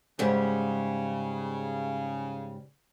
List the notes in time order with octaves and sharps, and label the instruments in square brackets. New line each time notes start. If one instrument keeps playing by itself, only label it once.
[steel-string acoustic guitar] G#2 G3 [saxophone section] C#3